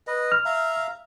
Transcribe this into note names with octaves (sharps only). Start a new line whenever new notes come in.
B4 D#5
F6
E5 F5 A#5